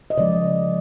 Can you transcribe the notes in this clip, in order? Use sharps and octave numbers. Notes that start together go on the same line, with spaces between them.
D#5
C#3 F3 G#3 D5